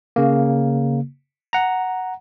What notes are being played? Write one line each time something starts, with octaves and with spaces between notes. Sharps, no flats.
C#3 A#3
F#5 A#5